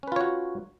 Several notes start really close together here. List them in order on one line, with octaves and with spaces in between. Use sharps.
C#4 B4 F4 C#5 F#4